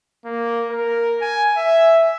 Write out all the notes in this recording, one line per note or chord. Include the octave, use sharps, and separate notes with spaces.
A#3
A#4
G#5
E5